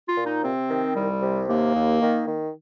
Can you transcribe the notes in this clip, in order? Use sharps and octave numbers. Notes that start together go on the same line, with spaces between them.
F4
A#2
D#4
C3 C4
D#3
C2 G3
C3
D#2 A#3
D#2
D#3
D#3